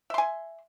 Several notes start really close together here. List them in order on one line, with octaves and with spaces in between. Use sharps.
E5 C6 G#5